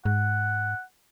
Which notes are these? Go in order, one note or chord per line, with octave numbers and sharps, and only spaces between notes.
G#2 F#5